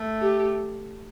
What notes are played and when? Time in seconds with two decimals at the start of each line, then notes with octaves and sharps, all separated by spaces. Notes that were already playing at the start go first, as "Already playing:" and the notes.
Already playing: A3
0.22 G4